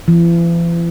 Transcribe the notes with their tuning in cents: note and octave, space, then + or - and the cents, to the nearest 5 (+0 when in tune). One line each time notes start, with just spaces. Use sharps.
E3 +45